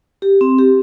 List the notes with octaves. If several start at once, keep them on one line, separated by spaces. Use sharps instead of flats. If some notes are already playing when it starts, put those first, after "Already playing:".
G4
C4
G4